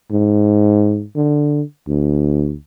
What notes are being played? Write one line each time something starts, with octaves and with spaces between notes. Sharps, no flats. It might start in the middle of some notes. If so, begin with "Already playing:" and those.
G#2
D3
D2